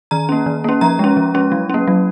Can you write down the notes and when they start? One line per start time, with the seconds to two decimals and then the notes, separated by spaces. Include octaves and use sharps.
0.11 D#3 A#5
0.29 A#3 C#4
0.46 D#3
0.64 A#3 C#4
0.81 F3 A#5
0.99 G#3 C#4
1.17 F3
1.34 G#3 C#4
1.52 F#3
1.70 A#3 C#4
1.87 F#3